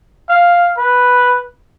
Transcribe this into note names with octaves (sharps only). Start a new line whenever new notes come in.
F5
B4